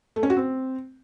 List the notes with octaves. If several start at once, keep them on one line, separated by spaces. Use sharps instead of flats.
A3
C#4
F#4
C4